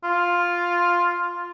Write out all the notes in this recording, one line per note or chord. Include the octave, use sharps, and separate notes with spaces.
F4